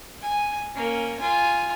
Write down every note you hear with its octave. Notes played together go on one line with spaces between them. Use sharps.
G#5
A#3 C#4
F4 G#5